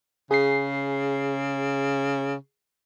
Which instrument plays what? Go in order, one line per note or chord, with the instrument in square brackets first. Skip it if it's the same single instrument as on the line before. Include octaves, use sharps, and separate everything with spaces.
[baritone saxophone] C#3 [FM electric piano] G#4 C7